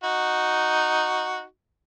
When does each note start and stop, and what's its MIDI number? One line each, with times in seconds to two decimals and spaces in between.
0.04 1.43 63
0.04 1.43 66